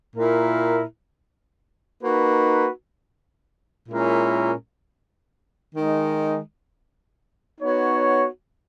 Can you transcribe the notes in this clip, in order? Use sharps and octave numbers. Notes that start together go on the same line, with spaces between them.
A#2 A#3 E4 A#4
A#3 D#4 F#4 B4
A#2 G#3 C#4 E4 A#4
D#3 G#3 D#4
B3 D#4 F#4 C#5